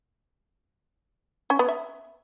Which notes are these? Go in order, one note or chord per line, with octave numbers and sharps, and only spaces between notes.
C#4
B3
E5